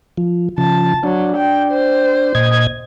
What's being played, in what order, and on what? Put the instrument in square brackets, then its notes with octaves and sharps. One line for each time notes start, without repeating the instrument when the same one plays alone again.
[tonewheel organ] F3
[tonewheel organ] C#3 F3 [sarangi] A5
[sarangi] F#3 [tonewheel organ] D4
[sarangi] G5
C5
[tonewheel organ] A#2 D#5 G#6